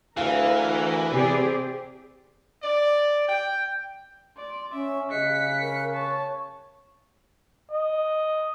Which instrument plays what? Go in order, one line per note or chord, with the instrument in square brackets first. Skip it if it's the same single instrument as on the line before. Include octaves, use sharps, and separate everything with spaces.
[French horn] D2 [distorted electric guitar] E3 [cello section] A#4 [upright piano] F5
[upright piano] C3 [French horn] C4 [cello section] G4 G#4 D5
[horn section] D5
G5
[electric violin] D5 [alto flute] C6
[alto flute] C#4 [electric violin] E5
[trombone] C#3 [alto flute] D#5 [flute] F#6 [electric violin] B6 C#7
[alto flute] A#4
[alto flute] C#5 [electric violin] A5 [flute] C#6
[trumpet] D#5